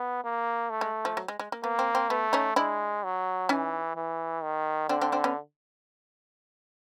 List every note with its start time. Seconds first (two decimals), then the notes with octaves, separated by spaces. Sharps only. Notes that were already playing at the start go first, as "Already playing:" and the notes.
Already playing: B3
0.24 A#3
0.70 A3
0.81 G#3
1.05 F3
1.17 F#3
1.28 G#3
1.40 G#3
1.52 A#3
1.64 A#3 B3
1.79 C4
1.95 C4
2.09 A3 B3
2.33 C#4 D#4
2.56 G#3 D4 E4
3.04 F#3
3.49 E3 C#4 D#4
3.96 E3
4.43 D#3
4.89 D3 C4 D4
5.01 C4 D4
5.12 C4 D4
5.24 B3 C#4